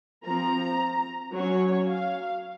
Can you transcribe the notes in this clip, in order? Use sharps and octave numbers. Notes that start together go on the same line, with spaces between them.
F3 C4 A#5
F#3 C#4 C#5
F5